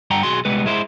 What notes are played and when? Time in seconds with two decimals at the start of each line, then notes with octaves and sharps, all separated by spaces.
0.10 G2 F#5 G5 A#5
0.23 B1 F#4 G#4 C6
0.45 C2 G3 G#3 B3 B4
0.66 G#3 E4 C5